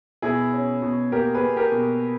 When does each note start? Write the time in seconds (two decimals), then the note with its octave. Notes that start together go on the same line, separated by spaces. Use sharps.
0.22 B2 E4 G#4
0.53 C#4
0.82 B2
1.12 A#3 G4 A#4
1.34 G#4 B4
1.42 A#3
1.57 G4 A#4
1.72 B2